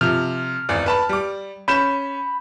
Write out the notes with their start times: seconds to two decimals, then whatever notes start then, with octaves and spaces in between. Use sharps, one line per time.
0.01 C3 F3 F6
0.69 G#1 E2 D5
0.86 B4 A5 B5
1.09 G3 D6
1.68 C#4 B5 G6 E7